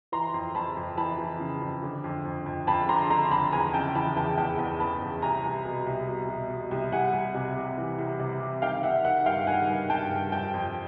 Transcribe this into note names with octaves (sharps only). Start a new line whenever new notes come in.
E3 A#5 C6
F2
F2 A5 B5
F2
E3 A5 B5
E3
C#3
F2
D3
F2
F2
F2
F2 A5 B5
D3 A#5 C6
D3 A#5 C6
F2 A5 B5
E2 G#5 A#5
C#3 G5 A5
E3 A5 B5
E2 G5 A5
E2 G5 A5
E2
E2 A5 B5
E2
C2 G#5 A#5
C2
B2
C2
B2
B2
B2
C2
C2 F#5 G#5
C2
C3
C2
E3
C2
C3
C2
D#3 F5 G5
D#3 E5 F#5
D#3 E5 F#5
G2 F5 G5
D#3 F#5 G#5
G2
G2 G5 A5
G2
F2 G5 A5
F2